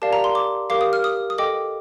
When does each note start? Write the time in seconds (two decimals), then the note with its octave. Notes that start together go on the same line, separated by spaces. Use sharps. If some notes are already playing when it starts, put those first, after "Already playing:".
0.02 G4 A#4 D5 F5 A5
0.13 A#5
0.24 C6
0.35 D6
0.70 G4 A#4 F5 D6
0.81 D#6
0.93 F6
1.04 D#6
1.30 D#6
1.38 A4 D#5 G5 D6